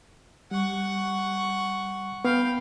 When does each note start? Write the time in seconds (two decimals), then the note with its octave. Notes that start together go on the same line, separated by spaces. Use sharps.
0.51 G3 F#5 C#6
2.25 B3 F5 G5 B5